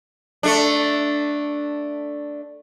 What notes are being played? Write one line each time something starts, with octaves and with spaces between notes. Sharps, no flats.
A3 D4